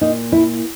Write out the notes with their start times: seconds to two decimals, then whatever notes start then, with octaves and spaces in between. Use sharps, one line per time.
0.01 A#2 A#3 D#4
0.32 E4